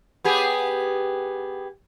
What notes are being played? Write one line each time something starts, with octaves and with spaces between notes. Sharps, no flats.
B3 G4 G#4